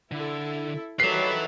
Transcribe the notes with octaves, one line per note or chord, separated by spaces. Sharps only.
D3 E4 A4
D#3 F#3 G4 A4 B4 D5 E5 C7